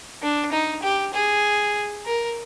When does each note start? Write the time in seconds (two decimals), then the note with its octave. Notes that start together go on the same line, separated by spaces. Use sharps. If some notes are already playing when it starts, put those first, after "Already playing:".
0.22 D4
0.52 D#4
0.83 G4
1.14 G#4
2.05 A#4